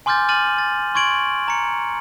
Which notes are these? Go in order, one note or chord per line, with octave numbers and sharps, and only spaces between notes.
G#5 C6 D6 F6 G6 A6
D6 F6 A6 D#7 F#7
A6
C6 C#6 G#6 D7 F#7
A#5 C#7